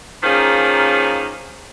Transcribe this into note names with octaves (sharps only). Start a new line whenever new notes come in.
D#3 F3 A#3 C#4 G#4